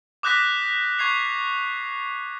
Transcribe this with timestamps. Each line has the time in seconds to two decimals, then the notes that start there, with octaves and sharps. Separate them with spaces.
0.23 D6 D#6 F#6 G6 A#6 B6
0.98 C#6 G#6 C7 F7